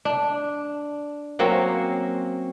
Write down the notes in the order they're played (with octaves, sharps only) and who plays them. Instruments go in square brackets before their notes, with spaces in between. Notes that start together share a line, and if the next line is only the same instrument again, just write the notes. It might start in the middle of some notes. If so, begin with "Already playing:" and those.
[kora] D4
F#3 A#3 C4 C#4